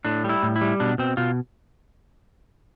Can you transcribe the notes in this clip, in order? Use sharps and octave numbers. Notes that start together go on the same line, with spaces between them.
A2 D4
G3
E4
A2
E4
G3
B2 D4
B2 C4
B2 F4